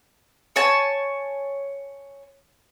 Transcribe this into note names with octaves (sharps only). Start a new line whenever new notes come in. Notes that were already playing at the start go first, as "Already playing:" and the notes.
C#5 G#5 A5